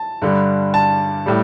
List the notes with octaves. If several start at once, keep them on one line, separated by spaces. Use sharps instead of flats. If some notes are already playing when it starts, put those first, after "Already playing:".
Already playing: A5
G2 D3 G3
A5
A2 G3